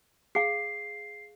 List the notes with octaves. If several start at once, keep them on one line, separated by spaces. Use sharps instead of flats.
G#4 F5 C7